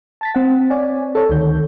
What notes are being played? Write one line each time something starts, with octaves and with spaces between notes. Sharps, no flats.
A5 A6 B6
C4 F#5
C#5 D5 G#5
A4 C#5
D2 D#3 G6